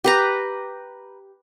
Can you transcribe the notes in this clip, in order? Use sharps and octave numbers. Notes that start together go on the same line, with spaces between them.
G4 B4 A#5